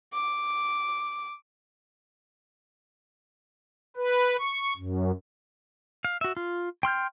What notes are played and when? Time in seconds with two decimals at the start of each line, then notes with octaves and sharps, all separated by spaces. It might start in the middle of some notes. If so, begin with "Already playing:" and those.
0.13 D6
3.96 B4
4.38 C#6
4.77 F#2
6.05 F5
6.21 F#4 E5
6.37 F4
6.83 G5 C6 F6 G6